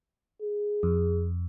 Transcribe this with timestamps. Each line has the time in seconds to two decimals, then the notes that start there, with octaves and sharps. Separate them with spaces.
0.42 G#4
0.83 F2